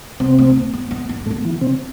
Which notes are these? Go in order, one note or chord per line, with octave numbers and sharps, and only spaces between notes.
C3 B3 C4
A3
A3
B3
B3
B3
B3
C4
A2 A3
B3
E3
C3 C4